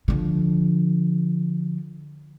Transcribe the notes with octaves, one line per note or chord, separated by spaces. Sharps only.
D3 F3